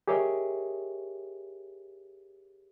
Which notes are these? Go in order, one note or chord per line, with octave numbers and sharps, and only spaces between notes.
G4 G#4 A#4 C#5 D#5 E5